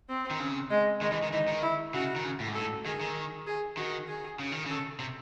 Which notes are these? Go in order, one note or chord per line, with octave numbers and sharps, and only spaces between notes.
C4
D#3
C#3
G#3
D#3 G#3
E3
D#3
E3 D#4
D#3
E4
C#3 F#4
D#3
C#3
A2
G#2
A2 A4
D#3 G#4
D#3
G#4
D#3 F#4
G#4
C#3
D#3
C#3 A4
C3